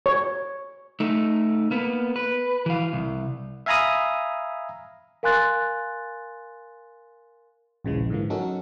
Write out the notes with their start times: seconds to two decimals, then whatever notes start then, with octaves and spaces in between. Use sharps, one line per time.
0.06 C#5
1.00 A3 D#4
1.71 A#3 B3
2.16 B4
2.66 E3 F5
2.93 C2
3.66 E5 F5 G#5 A#5 B5 D#6
5.23 A#4 F5 G#5 C6 F#6 A6
7.85 A#1 D#2 C#3 E3 F3 G#3
8.10 G#2 D3 E3 F3 A#3
8.30 F#3 C#4 D#4 F#4 A4 A#4